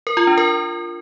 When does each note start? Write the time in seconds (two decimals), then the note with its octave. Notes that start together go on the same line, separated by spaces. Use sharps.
0.07 A#4
0.17 F4
0.27 D4
0.38 A#4